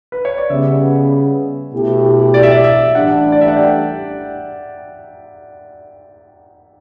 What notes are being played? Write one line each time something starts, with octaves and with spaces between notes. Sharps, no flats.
B4
C#5
D5
C#3 G3 B3 E5
B2 A3 E4 G4
D5
E5
D5
E5
A1 A2 G3 D4 F#5
D5
E5
F#5
G5